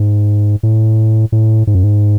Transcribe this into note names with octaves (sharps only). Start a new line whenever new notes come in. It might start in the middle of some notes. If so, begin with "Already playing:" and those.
Already playing: G#2
A2
A2
G#2
F#2
G#2